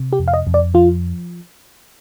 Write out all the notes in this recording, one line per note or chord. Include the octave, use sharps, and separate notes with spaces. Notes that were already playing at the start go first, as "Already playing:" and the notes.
Already playing: C3
G4
F2
F5
D#5
F2
D5
F3 F4